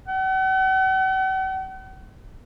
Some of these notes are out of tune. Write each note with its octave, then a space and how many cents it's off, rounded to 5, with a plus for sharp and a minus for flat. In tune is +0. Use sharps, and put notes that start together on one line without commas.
F#5 +45